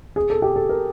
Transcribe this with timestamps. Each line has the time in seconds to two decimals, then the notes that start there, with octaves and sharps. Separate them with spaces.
0.16 G#4
0.30 A4
0.42 G4
0.56 A4
0.69 A#4